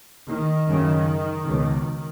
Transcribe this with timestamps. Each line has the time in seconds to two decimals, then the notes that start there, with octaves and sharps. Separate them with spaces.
0.27 D#3
0.66 F#2 C#3
1.45 C#2 B2